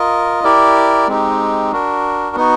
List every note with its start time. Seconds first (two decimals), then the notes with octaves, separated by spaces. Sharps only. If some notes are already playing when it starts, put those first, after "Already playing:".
Already playing: F4 A#4 D#5
0.44 E4 G4 A#4 D5
1.08 G#3 C4 D#4 G4
1.72 D4 F#4 A#4
2.36 B3 D#4 F#4